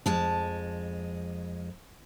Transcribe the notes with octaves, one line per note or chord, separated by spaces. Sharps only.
F2 G#3 A5